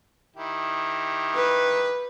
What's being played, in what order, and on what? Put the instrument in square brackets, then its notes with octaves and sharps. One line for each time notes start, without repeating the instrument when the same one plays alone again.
[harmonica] D#3 E4 G4
[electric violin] B4